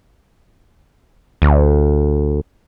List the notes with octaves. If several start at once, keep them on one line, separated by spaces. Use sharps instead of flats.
D2